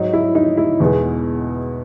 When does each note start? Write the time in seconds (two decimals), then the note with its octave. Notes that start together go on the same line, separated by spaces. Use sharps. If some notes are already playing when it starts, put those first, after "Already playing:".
Already playing: G#2 F#3 D#4
0.13 E4
0.35 D#4
0.57 E4
0.80 E2 B2 G#3